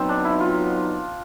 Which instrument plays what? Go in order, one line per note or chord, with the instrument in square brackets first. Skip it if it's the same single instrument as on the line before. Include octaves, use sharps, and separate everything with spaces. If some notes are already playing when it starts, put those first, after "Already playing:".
Already playing: [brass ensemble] F#3 B3 D#4 [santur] C4
[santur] D4
E4
F4